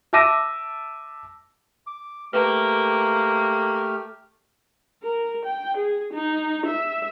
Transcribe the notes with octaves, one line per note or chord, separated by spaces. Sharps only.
E5 A5 D6 E6 A#6 D#7
D6
A3 A#3 G4 B4 F6
A#4
G5
G#4
D#4
E5